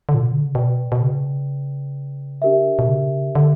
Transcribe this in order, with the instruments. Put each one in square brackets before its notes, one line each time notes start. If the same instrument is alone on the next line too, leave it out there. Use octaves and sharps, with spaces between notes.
[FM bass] D3
A#2
B2
D3
C#3
[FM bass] B2 [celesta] B4 D5 G5
[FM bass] B2
C#3
[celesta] D4 G4 A#4 E5
[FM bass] B2
C#3
D3